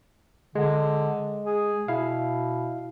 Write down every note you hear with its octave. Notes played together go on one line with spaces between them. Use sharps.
D3 G#3
G#4
B2 E4 F5